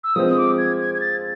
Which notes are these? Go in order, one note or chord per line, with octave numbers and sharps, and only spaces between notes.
E6
F3 G#3 C4 D#6
D6
G#6
G#6
G#6
A6